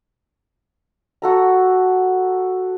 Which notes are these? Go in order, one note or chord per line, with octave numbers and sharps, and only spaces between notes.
F#4 A4 A#5